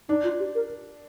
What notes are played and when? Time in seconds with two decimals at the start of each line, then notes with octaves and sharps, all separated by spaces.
0.09 D4 D#4
0.24 F4
0.40 G4
0.55 A#4